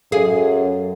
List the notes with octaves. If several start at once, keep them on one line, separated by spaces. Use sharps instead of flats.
F#2 G#4 A4 F5